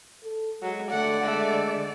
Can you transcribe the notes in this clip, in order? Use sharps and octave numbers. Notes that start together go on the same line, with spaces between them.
A4
F#3 G#3
D3 A3 D5 F#5
G#3 A3